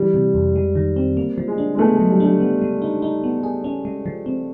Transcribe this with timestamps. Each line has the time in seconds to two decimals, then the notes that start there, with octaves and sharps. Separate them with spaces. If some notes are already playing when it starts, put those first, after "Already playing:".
Already playing: E3 G3
0.14 C3
0.34 F2
0.56 G#3
0.75 D#3
0.96 C4
1.17 A#3
1.38 F3
1.48 G#3
1.58 D4
1.74 G#3
1.78 A3 B3
1.94 F#3 G#3
2.10 G3
2.20 G3 D4
2.40 B3
2.61 G#3
2.82 D#4
3.02 D#4
3.24 B3
3.43 G#4
3.64 C#4
3.85 G#3
4.06 F3
4.26 C4